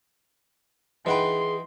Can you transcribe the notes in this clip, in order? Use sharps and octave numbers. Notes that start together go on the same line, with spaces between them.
E3 D#4 G#4 B4 F#5 G5 C6